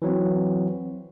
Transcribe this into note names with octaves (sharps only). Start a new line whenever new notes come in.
E3 F#3 C4